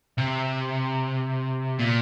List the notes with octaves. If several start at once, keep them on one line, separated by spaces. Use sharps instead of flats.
C3
A#2